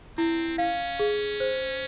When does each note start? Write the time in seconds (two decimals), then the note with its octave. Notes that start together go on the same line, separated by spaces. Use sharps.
0.18 C4 E4
0.58 C#4 F5
0.99 G#4
1.40 C5